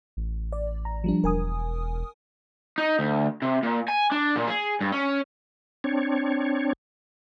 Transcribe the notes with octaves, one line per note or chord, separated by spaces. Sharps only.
A1
D5
A#5
F3 G3 D4
E1 A#4 G#5 D#6
D#4
D2
C3
A#2
G#5
D4
A#2
G#4
G2
C#4
C4 D4 C#5